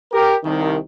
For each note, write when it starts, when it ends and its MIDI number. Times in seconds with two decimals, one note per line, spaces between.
0.12 0.35 67
0.12 0.35 70
0.44 0.77 36
0.44 0.77 51